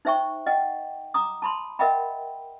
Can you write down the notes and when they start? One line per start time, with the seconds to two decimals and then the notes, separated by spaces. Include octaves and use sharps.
0.05 D#4 C5 E5 G5 C#6
0.46 D#5 F#5 G5
1.14 A#5 D6 D#6
1.42 A5 B5 C6
1.79 A#4 D#5 E5 F#5 G5 B5